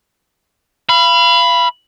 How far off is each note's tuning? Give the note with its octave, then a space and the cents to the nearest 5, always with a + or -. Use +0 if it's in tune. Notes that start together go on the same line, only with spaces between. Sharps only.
F5 -35 B5 +0